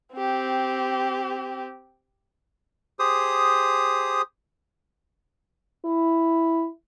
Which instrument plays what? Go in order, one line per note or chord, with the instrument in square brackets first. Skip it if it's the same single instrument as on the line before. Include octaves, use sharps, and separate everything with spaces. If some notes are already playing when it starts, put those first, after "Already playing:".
[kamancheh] C4 G4
[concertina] G4 G#4 C5 D#6
[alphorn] E4